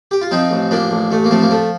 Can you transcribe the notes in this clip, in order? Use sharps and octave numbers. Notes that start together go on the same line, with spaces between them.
G4
F4
F3 C4 D#4
A1
F3 A#3 D4
A1
A1 A3
A#3
F3 A3 C4
A#3
F3 A3